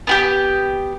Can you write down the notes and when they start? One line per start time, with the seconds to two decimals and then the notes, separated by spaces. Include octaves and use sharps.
0.07 B3 F#4 G4